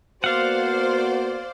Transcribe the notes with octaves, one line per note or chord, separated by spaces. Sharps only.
A#3 B3 F#4 C5 D5 F5 F#5